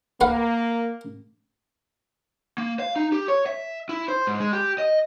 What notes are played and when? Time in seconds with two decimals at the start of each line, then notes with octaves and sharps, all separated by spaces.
0.21 A#3 B4 F5 F#5
2.58 A#3
2.79 F5
2.96 D#4
3.12 G4
3.28 C#5
3.46 E5
3.89 E4
4.08 C5
4.27 G#2
4.40 G#3
4.53 G4
4.78 D#5